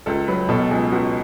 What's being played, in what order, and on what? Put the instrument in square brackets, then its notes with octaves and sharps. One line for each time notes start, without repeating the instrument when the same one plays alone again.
[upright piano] C#2 A4
F#3 B4
B2 A4
C#2 G#4
C#2 F#4